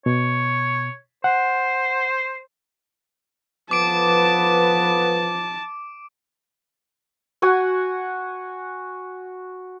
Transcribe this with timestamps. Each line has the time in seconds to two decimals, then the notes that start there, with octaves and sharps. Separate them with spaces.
0.06 B2 C#5
1.24 C5 F#5
3.71 F3 B3 A4 B4 A5 D6 D7
7.42 F#4 F#5 G#5